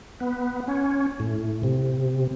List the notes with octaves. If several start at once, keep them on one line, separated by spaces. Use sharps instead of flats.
B3
C#4
A2
C3